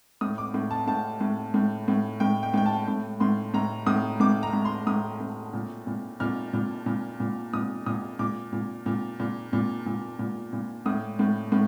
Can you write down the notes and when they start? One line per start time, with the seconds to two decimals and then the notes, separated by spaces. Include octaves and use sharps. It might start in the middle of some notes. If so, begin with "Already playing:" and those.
0.21 A2 D#6
0.38 D6
0.54 A2
0.71 A5
0.87 A2 A5
1.21 A2
1.54 A2
1.88 A2
2.20 A2 G5
2.43 G5
2.54 A2 G5
2.66 A5
2.88 A2
3.20 A2 C6
3.54 A2 A#5
3.86 A2 D#6
4.20 A2 D6
4.43 A#5
4.53 A2
4.65 C6
4.87 A2 D#6
5.20 A2
5.54 A#2
5.87 A#2
6.20 A#2 F6
6.53 A#2
6.86 A#2
7.20 A#2
7.53 A#2 D#6
7.86 A#2 D#6
8.19 A#2 D6
8.53 A#2
8.86 A#2
9.20 A#2
9.53 A#2
9.86 A#2
10.19 A#2
10.53 A#2
10.86 A2 D#6
11.19 A2
11.52 A2